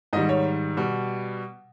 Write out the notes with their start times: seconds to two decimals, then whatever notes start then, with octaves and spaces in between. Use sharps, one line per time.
0.13 G#2 D#3 G3 D#5
0.29 C#5
0.77 B2 G3